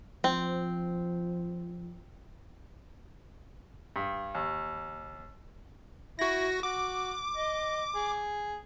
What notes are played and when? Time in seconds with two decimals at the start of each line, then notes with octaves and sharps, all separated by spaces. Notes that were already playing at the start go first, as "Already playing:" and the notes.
0.24 F3 C4
3.96 G2
4.35 D#2
6.19 E4 F#4 A#6
6.63 F#4 D6
7.36 D#5
7.95 G#4